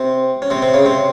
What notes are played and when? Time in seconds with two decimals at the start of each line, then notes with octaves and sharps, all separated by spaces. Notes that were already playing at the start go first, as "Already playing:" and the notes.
Already playing: C3 C4
0.42 C#4
0.50 C3 C4
0.62 C3 C4
0.74 C#3 C#4
0.85 C3 C4